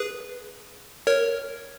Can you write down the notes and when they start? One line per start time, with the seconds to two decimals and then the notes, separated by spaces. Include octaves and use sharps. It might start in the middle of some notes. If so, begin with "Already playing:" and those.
Already playing: G#4 B4
1.07 A#4 C#5